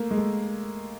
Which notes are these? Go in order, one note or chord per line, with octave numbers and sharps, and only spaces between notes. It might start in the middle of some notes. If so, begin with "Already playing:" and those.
Already playing: A3 A#3
G#3
A3